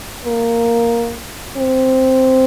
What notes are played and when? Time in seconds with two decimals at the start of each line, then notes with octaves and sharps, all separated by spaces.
0.25 A#3
1.57 C4